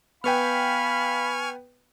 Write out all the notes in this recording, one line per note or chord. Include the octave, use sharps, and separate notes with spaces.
B3 B4 F5 G5 G#5 B5 C#6 F6